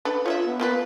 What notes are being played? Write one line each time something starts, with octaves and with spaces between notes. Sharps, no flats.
D4 A4 B4
F4 C#5 D#5 E5
B3
A#3 F4 B4